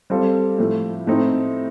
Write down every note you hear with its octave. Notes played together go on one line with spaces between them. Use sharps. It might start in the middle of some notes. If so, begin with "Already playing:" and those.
G3 C4 F4 A4
A2 F3 A3
A2 A3 C4 D#4